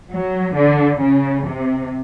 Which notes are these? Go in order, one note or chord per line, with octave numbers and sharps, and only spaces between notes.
F#3
D3
C#3
C3